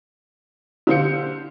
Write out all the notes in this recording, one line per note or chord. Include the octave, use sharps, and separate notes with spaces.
D3 G4 C5 F5 G6 C#7